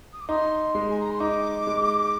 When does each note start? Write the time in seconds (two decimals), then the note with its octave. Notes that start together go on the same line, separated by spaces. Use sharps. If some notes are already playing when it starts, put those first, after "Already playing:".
0.13 D#6
0.21 D6
0.29 D#4 C6
0.75 G#3
0.90 G#5
1.01 A#5
1.11 C6
1.20 D#4 D6
1.67 G#3